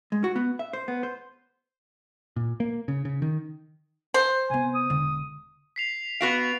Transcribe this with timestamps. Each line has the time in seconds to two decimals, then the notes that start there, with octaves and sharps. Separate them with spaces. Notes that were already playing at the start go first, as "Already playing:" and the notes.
0.12 G#3
0.24 F#4
0.36 B3
0.59 E5
0.73 C5
0.88 B3
1.03 C5
2.36 A#2
2.60 A#3
2.88 C#3
3.05 C#3
3.22 D#3
4.14 C5
4.50 C3 B3 G#5
4.74 D#6
4.90 E1 D3
5.76 B6 C7 F7
6.21 B3 F#4 F5 D7 F7